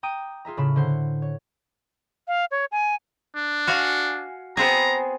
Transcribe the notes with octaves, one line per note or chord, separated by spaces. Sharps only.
G5 A#5 D6 D#6 D#7
F4 G#4 E5 A#5
A2 C#3 B5 E7
D3 C5 F#5
C#5
F5
C#5
G#5
D4
F#4 F5 G#5
B3 C4 G#4 A#5